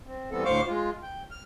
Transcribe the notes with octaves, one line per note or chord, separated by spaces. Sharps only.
C4
E3 G3 B3 C4 A4
D2 A2 C5 F5 C#6 D6
G#3 F4
G5
F6